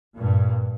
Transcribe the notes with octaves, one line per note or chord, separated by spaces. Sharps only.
G2 A#2